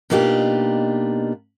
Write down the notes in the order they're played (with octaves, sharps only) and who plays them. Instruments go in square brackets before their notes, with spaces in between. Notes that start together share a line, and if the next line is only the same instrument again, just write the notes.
[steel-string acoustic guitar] B2 A#3 D4 D#4 F4 G4